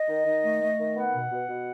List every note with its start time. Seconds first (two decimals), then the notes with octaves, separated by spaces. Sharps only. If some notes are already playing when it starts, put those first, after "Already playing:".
Already playing: D#5
0.08 D#3
0.26 D#3
0.44 A3
0.61 A3
0.79 D#3
0.96 B3 F#5
1.14 B2
1.31 B2
1.48 B2